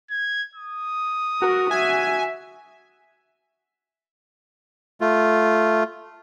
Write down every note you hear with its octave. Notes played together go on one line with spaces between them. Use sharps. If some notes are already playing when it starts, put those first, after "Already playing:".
G#6
D#6
F#4 A#4
F#4 E5 G#5
A3 F4